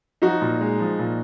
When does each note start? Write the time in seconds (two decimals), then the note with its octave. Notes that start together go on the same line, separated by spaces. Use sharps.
0.22 F3 D#4 F#4
0.41 A#2
0.61 G#3
0.79 F3
0.99 A#2